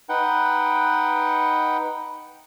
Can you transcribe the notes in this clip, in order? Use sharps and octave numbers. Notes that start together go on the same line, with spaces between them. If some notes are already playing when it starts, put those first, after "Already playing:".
D#4 B4 F#5 G5